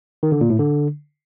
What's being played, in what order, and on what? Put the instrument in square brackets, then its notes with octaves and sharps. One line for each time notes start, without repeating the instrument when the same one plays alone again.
[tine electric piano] D#3
D3
A#2
A2
D3